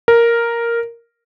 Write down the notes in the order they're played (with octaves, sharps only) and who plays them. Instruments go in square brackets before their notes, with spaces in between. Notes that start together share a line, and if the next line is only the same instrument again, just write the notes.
[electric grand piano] A#4